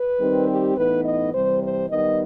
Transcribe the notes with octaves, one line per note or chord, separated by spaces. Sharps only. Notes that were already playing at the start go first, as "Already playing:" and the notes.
Already playing: B4
D#3 G3 C4 D#4
G4
A2 E3 B3 D#4 B4
D#5
C3 E3 G3 C5
C5
D#3 G3 B3 D#4 D#5